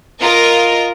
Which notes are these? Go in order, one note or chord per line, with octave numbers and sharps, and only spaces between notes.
F4 A#4 D#5 A#5